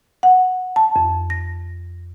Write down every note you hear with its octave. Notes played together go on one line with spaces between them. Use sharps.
F#5
A5
F2
A#6